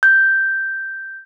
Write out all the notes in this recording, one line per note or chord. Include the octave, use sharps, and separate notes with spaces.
G6